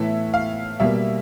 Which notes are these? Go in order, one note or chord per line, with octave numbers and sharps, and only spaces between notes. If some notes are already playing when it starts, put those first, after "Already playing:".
Already playing: A2 E3 A3 E5
F5
B2 G3 A#3 E5